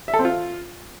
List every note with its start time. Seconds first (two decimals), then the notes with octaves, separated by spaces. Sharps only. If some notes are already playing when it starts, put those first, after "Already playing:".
0.08 E5
0.14 A4
0.19 C4
0.25 F4